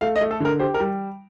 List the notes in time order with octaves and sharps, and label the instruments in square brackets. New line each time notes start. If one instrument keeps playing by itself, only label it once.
[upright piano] A3 [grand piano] F5
[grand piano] D#5
[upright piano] A3
[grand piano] A4
[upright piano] D3 [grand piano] A#4
[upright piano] G4 [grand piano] C5
[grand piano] A#4
[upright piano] G3